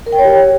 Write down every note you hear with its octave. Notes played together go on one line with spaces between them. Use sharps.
A#4
G5
C#5
G4